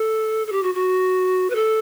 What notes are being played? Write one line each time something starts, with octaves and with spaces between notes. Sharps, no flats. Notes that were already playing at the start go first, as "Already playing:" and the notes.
Already playing: A4
A4
G4
F#4
F#4
B4
A4